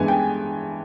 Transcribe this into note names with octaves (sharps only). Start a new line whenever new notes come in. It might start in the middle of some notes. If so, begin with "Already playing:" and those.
Already playing: G2 E3 G#3 B3 G#5
G5